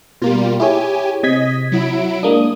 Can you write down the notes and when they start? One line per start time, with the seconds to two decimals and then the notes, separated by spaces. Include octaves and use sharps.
0.22 B2 G3 A#3 F4
0.60 E4 G4 G#4 C#5 G#5
1.23 C3 D#5 G#6 B6
1.72 F#3 E4 D7
2.23 G#3 A#3 D4 D#6